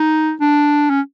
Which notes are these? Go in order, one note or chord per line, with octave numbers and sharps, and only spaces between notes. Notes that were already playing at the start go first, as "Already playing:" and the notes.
Already playing: D#4
D4
C#4